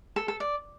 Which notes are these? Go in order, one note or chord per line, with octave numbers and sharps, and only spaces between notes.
A4
A4
D5